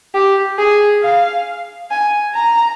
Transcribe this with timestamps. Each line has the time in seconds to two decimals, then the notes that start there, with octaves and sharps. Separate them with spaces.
0.14 G4
0.58 G#4
1.03 F5
1.91 G#5
2.35 A#5